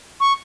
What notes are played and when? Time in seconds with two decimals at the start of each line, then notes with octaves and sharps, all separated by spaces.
0.20 C#6